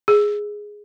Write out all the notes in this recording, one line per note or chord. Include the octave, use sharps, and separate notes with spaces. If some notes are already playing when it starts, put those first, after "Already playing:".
G#4